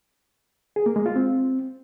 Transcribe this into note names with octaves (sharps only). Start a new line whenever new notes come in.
G#4
A#3
G#3
F4
C4